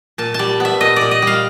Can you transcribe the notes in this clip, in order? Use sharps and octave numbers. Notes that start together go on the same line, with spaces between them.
A#2 A5
G3 A5
B3 E5
A#2 D#5
A#2 D5
D#5
G3 F5